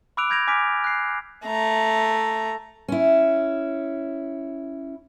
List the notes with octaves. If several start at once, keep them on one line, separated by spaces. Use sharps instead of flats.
B5 D6 E6 F#6 D7 F7
B5 G6 G#6 A#6 D7 F7
G#5 D6 F6 B6 D7
F#6 C7
A3 A#5
C#4 E4